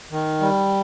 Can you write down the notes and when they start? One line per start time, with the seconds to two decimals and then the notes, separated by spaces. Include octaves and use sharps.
0.11 D#3
0.41 G3